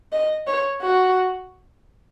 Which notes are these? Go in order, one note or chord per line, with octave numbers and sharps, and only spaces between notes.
D#5
C#5
F#4